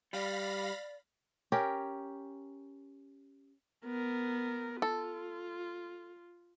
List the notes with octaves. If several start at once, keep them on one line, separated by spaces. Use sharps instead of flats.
G3 D5 F5 B5 A#6
C#4 G4 A#4
B3 A#4
F4 A4